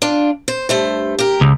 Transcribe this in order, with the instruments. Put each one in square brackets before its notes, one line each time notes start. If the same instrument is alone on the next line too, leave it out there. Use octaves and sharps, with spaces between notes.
[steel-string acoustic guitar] D4 F4
C5
G2 A3 C5
G4 A#4
[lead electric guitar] C#2